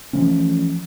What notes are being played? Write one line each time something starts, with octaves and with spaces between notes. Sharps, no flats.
E3 F3 A3 C#4